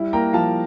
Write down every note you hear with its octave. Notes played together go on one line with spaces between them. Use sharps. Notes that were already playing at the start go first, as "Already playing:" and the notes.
Already playing: G3 E4
A#3 G5 A#5
F3 F5 A5